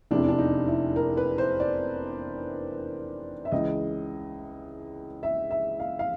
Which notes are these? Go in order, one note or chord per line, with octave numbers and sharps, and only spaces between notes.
F1 E2 C3 E3 D4
D4
D#4
E4
A#4
B4
C5
D5
E5
C#2 C#3 E3 D#5
E5
E5
F5
F5